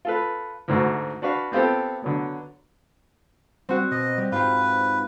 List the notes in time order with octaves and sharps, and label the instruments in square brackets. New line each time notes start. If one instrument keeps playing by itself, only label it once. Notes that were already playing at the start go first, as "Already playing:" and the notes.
[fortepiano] F4 A4 B4
D2 G#2 A3 F#4
D4 F#4 B4 F5
B3 C4 F4 G4 A4
D3 F#3 B3
[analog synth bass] G3 [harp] C4 F#4
[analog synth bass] B2 [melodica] D#5
[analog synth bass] G3
[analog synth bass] G#2 [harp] F4 G4 [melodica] B4